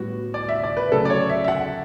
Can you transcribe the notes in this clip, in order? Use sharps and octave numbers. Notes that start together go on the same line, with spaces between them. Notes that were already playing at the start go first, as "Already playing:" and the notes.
Already playing: A2 G3 B3 F#4
D5
E5
D5
B4
C#3 F#3 A3 A4
D5
C#5
E5
E5
F#5